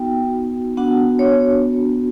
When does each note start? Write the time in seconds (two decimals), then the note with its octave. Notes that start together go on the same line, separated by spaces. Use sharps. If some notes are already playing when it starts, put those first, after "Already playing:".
Already playing: B3 D#4 F#4 G5
0.77 B3 D4 F#4 F#5
1.19 C#5